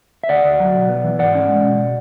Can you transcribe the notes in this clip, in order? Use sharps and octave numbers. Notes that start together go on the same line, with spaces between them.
E5
D2 D5 F#5
D2
F#3
B1
B3
E3
G#2 D5 F#5
C#4
G#3
B2
B2